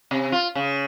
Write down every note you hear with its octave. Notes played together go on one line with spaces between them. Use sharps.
C3
F4
C#3